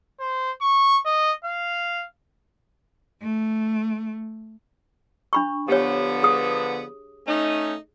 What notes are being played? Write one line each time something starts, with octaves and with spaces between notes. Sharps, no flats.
C5
C#6
D#5
F5
A3
D4 B5 C#6
D3 F3 B3 G4 C#5
G#4 D#6
A3 C#4 D#4